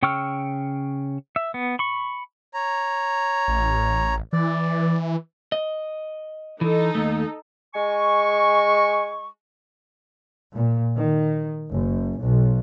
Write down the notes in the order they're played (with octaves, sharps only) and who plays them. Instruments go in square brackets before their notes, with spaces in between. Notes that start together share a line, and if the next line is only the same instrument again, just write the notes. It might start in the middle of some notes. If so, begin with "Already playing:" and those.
[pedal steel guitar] C#3 G5 C#6 E6 F6
E5
B3
B5 C#6
[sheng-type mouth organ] C#5 A#5
[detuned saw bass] A1
[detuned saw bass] E3 [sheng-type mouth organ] D5
[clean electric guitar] D#5
[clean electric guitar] E3 [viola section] D#4 A4
[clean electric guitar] D#2 A3
[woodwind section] G#3 G#5 C#6
[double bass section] A#2
D#3
F#1
B1